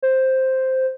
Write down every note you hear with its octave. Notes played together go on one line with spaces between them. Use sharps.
C5